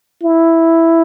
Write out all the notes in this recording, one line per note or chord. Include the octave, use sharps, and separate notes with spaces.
E4